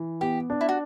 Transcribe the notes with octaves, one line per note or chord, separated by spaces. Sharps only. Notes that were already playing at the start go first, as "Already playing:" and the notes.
Already playing: E3
B3 G4
D4
E4
F#4